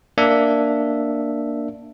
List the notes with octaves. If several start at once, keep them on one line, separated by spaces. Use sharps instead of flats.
A#3 D4 E5